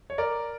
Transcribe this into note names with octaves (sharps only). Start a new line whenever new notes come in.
C#5
A#4 D5